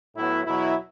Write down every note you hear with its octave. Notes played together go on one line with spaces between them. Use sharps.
A2 F#3 B3 E4
E2 B2 F#3 E4